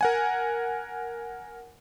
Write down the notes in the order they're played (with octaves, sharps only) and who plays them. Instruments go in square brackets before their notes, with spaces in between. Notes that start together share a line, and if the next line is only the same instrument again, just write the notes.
[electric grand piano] A#4 F#5 G#5